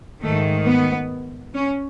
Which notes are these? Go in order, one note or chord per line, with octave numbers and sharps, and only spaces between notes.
G#2 D#3 A3
B3
C#4